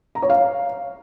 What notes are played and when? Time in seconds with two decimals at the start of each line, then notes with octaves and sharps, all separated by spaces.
0.15 A#5
0.22 C#5
0.30 F5